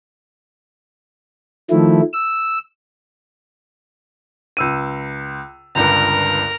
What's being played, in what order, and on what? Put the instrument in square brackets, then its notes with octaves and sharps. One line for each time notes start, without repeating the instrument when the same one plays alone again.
[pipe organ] D#3 F3 A3 E4
E6
[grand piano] C#2 E6 D#7
[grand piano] G1 C#2 G2 [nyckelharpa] A#4 A#5